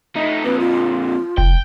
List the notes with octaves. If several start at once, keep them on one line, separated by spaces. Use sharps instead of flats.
A3 D#4
F2 A#2 B4
F4
F1 G5